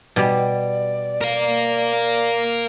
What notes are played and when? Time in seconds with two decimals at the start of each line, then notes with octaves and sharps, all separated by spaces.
0.16 B2 G3 D5
1.21 A#4 F5